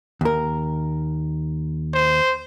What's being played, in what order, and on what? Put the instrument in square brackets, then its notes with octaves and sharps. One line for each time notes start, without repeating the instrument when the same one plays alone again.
[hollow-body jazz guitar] D#2 A#4
[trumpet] C5